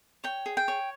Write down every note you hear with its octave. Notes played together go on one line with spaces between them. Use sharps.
C#5 G5
G#4
G5
C#5